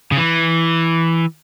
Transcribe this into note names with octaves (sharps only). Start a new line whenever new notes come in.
C#3
E3